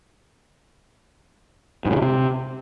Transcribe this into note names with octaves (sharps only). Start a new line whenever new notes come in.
G#2
A2
C#3
C3